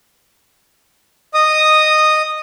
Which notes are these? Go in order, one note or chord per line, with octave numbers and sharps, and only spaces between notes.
D#5 D#6